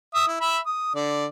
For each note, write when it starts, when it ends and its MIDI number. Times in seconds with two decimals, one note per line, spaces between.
0.14 0.25 76
0.14 0.25 87
0.27 0.36 64
0.41 0.58 76
0.41 0.58 83
0.66 0.91 87
0.95 1.26 50
0.95 1.26 74